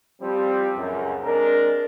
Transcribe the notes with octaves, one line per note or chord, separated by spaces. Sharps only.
F3 G3 C4
C#2 F#2
G#3 C4 D4 A#4